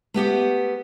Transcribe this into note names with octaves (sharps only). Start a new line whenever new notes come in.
A3 B3 G4 F#5